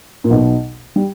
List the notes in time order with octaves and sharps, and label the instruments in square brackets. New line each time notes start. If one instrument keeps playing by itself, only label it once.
[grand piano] A#2
B1 B2
G3